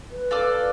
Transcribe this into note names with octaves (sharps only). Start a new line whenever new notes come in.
B4
F4 A4 D5